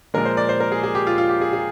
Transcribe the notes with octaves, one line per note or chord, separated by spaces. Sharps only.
A#2 F3 G#3 A#4
C5
D5
C5
A#4
G#4
G#4
G4
F4
F4
G4
G#4
G#4